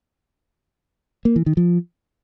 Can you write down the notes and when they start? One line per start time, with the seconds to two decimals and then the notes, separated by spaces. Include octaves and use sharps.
1.25 A#3
1.36 E3
1.46 D#3
1.57 F3